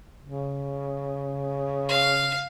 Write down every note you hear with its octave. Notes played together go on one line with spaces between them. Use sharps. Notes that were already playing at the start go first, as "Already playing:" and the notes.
C#3
F5